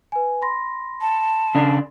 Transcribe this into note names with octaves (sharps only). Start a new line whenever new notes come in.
B4 G#5
B5 C6 A#6
A5
C#3 D4